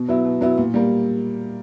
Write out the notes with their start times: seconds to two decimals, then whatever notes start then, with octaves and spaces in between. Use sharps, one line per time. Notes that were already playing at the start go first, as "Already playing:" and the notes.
Already playing: B2
0.09 F#3 B3 E4
0.25 B2
0.41 F#3 B3 E4
0.58 A#2
0.74 G3 A#3